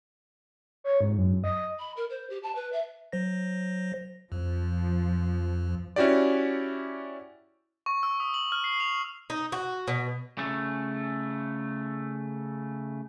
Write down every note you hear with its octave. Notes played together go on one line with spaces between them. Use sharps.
C#5
G#2
F#2
D#5
B5
A#4
C5
G4
A5
B4
E5
F#3 C5 A#6
F2 F3
C#4 E4 F#4 G4 D5
C#6
E6
D#6
F#7
F6
C7
F7
D#4
F#4
B2
C#3 A3